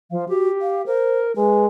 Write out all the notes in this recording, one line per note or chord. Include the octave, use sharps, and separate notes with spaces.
F3 F5
F#4 G4
F5
A#4 C5
G#3 B4